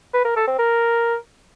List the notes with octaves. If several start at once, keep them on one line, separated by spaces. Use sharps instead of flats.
B4
A#4
A4
C4
A#4